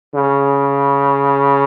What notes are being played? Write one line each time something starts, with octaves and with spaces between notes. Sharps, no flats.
C#3